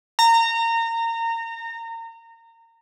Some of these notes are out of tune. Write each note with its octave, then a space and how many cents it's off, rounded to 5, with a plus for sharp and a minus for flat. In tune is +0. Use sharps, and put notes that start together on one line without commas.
A#5 -25